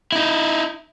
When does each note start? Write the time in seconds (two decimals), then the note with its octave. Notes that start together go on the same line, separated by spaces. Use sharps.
0.12 D#4 E4